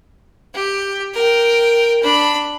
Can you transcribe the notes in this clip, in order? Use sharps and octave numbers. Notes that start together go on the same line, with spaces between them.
G4
A#4 G5
D4 B5